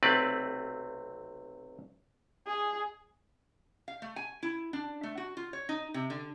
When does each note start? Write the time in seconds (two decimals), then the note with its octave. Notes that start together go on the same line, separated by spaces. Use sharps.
0.03 B1 C3 A3 C4 B4 D5
2.47 G#4
3.88 F5
4.02 A3
4.16 G#5
4.43 E4
4.73 D4
5.03 A3
5.18 F#4
5.37 F4
5.53 C#5
5.69 D#4
5.94 C3
6.10 D3